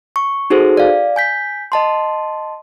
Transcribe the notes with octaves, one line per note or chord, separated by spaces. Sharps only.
C#6
D#4 F#4 G#4 A4 C5
D5 F5
G#5 G6 B6
D#5 A5 C6